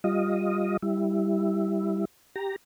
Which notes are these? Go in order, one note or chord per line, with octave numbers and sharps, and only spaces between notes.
G3 F4 D#5
G3 E4
G4 A#5